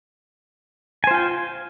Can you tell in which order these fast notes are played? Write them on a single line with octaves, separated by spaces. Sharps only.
G#5 C5 F4 G5